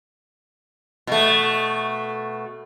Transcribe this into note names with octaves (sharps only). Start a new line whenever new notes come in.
B2 A3